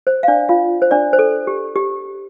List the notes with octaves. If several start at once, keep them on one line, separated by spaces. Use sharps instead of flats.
C5
F5
D4 D5
F4 F5
C5
D4 D5
C5
A4
G4
G4